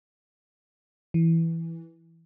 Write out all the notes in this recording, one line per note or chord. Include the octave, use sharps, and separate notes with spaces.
E3